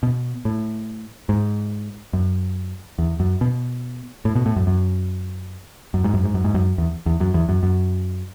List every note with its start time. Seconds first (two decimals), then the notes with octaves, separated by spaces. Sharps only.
0.03 B2
0.45 A2
1.29 G#2
2.13 F#2
2.98 E2
3.20 F#2
3.41 B2
4.25 A2
4.36 B2
4.46 A2
4.56 F#2
4.67 F#2
5.94 F#2
6.04 G#2
6.14 F#2
6.24 G#2
6.34 F#2
6.44 G#2
6.54 F#2
6.78 E2
7.06 E2
7.20 F#2
7.34 E2
7.49 F#2
7.63 F#2